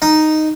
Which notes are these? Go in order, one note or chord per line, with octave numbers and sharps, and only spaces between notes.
D#4